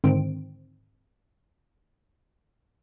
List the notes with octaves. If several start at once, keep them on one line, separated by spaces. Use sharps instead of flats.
G#2 D3 D#3 C4 D7